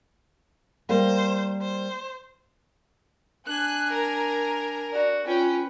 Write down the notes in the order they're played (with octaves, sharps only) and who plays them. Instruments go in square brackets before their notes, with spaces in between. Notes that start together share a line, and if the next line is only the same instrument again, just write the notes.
[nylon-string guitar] G3 A#3 [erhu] C5
[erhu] C5
[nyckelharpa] D4 G#5 [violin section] F#6
[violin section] A#4
[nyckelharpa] F#4 [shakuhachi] D5
[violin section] C#4 G5 [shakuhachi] F4 [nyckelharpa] B4